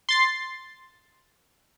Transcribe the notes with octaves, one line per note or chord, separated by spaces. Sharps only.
C6 A6 C7